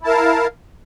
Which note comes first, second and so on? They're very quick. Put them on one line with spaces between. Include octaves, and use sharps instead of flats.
E4 A5 A#4 F5